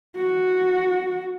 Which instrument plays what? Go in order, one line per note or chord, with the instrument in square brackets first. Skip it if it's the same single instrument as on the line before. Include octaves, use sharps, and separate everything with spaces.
[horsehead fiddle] F#4